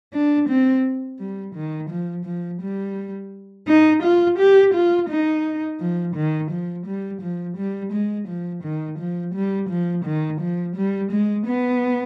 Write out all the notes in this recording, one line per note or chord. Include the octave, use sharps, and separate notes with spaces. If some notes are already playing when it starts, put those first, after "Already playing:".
D4
C4
G3
D#3
F3
F3
G3
D#4
F4
G4
F4
D#4
F3
D#3
F3
G3
F3
G3
G#3
F3
D#3
F3
G3
F3
D#3
F3
G3
G#3
B3